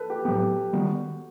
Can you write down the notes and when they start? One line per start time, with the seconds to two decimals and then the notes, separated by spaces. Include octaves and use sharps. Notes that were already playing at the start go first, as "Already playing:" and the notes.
Already playing: A4 B4
0.10 G4
0.25 A2 F#3 B3 G4
0.73 D#3 G3 B3 F#4